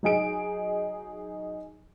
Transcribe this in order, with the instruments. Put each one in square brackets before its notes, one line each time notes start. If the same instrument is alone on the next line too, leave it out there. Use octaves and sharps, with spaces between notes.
[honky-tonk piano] F#3 D#4 G#4 D7